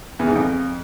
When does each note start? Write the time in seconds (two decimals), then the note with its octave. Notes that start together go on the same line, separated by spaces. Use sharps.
0.19 E2
0.28 G#2
0.36 F2